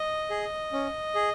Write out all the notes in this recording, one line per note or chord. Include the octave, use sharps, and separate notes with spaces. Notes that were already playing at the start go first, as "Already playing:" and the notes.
Already playing: D#5
G#4
C#4
G#4